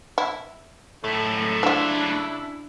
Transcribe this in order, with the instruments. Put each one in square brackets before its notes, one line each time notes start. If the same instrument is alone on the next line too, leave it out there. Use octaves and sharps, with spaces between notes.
[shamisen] E4
[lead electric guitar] F#2 A3 [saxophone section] A2
[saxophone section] C#3 E4 [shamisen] F3 F4 [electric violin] D4